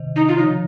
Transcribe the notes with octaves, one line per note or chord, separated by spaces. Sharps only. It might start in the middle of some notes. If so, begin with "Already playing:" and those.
Already playing: C3 D#3
D#4
F4
C#3 F3 D#4